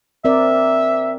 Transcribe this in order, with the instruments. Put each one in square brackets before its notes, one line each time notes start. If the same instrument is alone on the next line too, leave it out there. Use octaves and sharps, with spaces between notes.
[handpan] C4 A#4 D5 [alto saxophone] E5